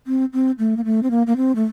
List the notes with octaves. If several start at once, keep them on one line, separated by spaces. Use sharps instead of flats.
C4
C4
A3
A#3
A3
C4
A#3
A#3
C4
A3